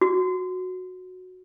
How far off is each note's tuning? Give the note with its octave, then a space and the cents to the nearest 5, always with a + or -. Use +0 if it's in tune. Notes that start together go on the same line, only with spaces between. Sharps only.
F#4 -10